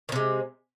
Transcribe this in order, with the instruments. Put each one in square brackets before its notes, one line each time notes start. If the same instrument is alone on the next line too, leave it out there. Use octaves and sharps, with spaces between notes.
[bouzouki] D#3
C3
G#3